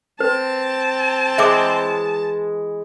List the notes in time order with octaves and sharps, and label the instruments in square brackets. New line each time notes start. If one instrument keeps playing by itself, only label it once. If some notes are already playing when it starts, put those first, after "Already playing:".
[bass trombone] C4 [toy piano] B4 [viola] A5
[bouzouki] E3 G#3 [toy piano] E5 D6